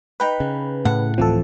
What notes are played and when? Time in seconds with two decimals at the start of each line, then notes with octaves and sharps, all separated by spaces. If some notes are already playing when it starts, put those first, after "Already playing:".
0.20 D#4 B4 G5 B5
0.40 C#3
0.85 A2 F#5
1.18 D1 E3 F3 C4 A4